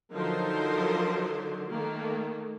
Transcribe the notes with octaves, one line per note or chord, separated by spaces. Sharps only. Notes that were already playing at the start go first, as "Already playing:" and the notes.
D3 F3 F#3 D#4 A#4 C5
D#3 A3 A#3